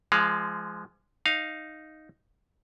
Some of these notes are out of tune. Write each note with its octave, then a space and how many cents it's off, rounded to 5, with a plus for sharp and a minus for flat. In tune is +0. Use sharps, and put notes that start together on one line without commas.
F3 -30 G#3 +0 F5 +0
D#4 +0 F5 +0